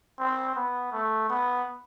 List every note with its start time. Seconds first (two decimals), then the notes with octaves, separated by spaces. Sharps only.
0.19 C4
0.55 B3
0.92 A3
1.30 B3